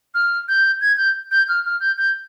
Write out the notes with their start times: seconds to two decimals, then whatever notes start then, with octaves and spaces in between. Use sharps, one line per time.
0.14 F6
0.48 G6
0.81 G#6
0.97 G6
1.31 G6
1.48 F6
1.65 F6
1.81 G6
1.98 G6